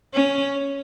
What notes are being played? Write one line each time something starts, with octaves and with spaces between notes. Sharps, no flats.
C#4